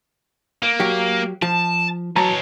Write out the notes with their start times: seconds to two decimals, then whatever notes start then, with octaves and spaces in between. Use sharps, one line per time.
0.63 A#3
0.80 F#3 G4
1.42 F3 A5
2.16 E3 F#3 C#5 A5 A#5